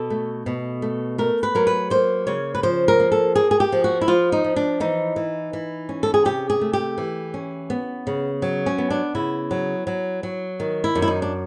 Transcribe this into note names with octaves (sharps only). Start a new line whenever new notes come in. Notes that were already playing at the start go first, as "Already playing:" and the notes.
Already playing: B2 A4
A3
B2
A3
A3 A#4
B4
F#3 A#4
B4
A#3 C5
C#3 C#5
B4
F3 C5
A#4
A#3
A4
A#3 G#4
G#4
G4
F3
F#4
E4
F3 F4
D#4
F3
D4
E3 D#4
E3
E3
C#4
A4
G#4
C3 G4
G#4
A3
G4
E3
C#4
B3
C#3
F#3
C#4
B3
D4
C#3 E4
F#3
F#3
F#3
D#3
E4
F#2
E4
D#4
D4